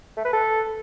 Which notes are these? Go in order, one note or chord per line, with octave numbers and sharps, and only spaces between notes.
A3
B4
A4